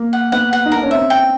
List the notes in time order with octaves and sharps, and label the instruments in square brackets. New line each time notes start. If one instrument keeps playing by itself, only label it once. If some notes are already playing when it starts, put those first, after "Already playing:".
Already playing: [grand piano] A#3
[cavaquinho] F#5
[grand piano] B3 [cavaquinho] F#5
[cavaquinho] F#5
[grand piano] D#4
[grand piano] D4 [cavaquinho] A#4
[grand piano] C#4
[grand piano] C4 [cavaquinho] E5
[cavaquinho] G5